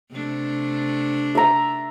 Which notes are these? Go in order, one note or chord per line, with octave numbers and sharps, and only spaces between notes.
C3 A3 D4
E5 A#5